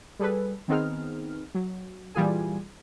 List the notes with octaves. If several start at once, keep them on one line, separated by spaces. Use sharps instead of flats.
G3 G#4 A4 B4
D#3 B3 C4 D#4 G#4 F6
F#3
A#2 E3 G3 F4 G#4 G#5